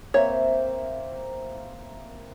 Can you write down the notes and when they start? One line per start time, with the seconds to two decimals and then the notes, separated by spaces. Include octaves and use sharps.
0.14 A#3 C4 C#5 E5